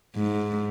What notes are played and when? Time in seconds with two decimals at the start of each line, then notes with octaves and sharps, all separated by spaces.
0.16 G#2